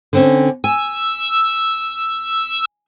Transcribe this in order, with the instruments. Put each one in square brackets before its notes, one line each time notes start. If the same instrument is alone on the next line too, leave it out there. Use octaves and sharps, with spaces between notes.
[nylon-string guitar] D3 C4 C#4
[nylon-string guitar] G#5 [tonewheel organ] E6